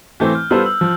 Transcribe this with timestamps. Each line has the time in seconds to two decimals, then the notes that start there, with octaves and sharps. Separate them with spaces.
0.20 E3 A3 C4 G6
0.35 F6
0.50 G3 B3 F4 A4 C5 E6
0.66 E6
0.81 F3